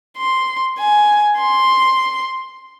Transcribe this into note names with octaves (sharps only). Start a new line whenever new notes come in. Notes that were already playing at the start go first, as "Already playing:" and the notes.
C6
G#5
C6